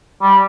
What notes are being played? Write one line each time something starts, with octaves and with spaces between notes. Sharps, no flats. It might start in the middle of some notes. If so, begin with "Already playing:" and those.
G3